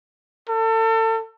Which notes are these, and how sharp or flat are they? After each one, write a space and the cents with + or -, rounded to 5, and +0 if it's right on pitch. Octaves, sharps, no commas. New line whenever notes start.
A4 +35